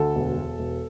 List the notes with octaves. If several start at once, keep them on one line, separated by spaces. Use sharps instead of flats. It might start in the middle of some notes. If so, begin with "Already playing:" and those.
Already playing: D2 A4
E1
E1
E1